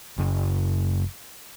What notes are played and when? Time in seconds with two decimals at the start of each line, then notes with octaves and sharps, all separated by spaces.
0.18 F#1